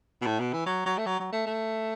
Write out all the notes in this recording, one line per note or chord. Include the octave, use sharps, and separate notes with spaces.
B2
A2
B2
E3
F#3
F#3
A3
F#3
F#3
A3
A3